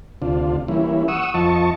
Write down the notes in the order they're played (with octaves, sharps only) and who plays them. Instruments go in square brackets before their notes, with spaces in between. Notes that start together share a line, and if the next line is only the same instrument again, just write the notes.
[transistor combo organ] D2 C3 D4 F4
E3 G3 A#3 C#4 E4
F#5 C#6 D#6 E6
F2 F3 D#5 A5 C#6